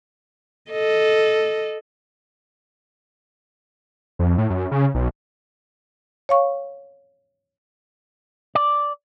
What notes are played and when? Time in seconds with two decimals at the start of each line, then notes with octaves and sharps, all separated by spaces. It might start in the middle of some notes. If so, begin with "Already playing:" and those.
0.71 A4 D#5
4.19 F2
4.38 A2
4.50 F#2
4.71 C#3
4.95 B1
6.29 C#5 F5 C#6
8.55 D5